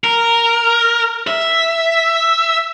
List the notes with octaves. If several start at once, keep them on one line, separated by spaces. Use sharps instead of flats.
A#4
E5